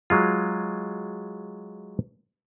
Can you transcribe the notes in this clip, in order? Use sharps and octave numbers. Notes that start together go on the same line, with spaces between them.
F#3 G#3 F4